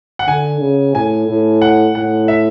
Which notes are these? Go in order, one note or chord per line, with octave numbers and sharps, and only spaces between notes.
F#5
D3 G#5
C#3
A2 G#5
A2
F#5
A2 F#5
E5